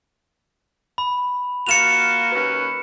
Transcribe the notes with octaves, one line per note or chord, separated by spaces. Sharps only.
B5
A#3 F4 F#4 C#7 E7 F7
D#2 C#4 B4